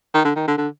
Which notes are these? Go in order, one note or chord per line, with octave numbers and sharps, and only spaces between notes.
D#3
D3
D#3
D3
D3